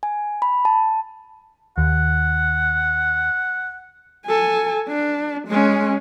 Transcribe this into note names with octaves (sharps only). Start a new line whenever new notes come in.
G#5
B5
A5
D#2 F#5
A4 G#5
D4
G#3 C#4